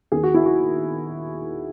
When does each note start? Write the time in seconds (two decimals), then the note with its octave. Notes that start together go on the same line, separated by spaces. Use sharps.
0.12 D#2 D#3 G#4
0.23 F#4
0.34 E4
0.46 F#4